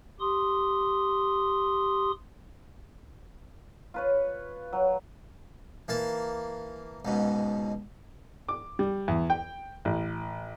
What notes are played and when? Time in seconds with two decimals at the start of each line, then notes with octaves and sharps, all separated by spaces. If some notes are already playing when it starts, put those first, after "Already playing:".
0.20 G4 C6 D#6
3.94 F4 B4 C#5
4.73 F#3
5.88 E3 A#3 A5
7.05 C#2 G#2 B2
8.49 D6
8.79 G3
9.08 E2
9.30 G5
9.85 A1